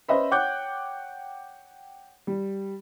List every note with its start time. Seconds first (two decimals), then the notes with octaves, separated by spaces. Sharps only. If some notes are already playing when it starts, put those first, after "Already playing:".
0.09 C#4 B4 C5 D#5 E5 B5
0.31 C#5 F#5 G5 D6 F#6 G6
2.27 G3